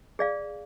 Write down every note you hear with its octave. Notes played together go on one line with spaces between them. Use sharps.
G#4 D5 F5